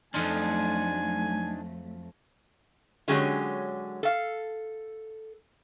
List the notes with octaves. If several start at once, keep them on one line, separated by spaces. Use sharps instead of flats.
F2 F3 F#3 A3 D4 D#4 F4 G#5
D3 F#3 G#3 C#4 G4 G#4
A4 F5